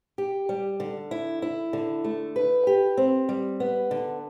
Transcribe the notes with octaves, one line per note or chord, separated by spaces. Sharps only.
G4
G3
D3
E4
E4
D3
A3
B4
G4
C4
G3
B3
D3